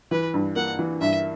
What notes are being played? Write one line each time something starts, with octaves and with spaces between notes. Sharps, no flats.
E3 B4
G2
A#3 F#5
E3
G2 E5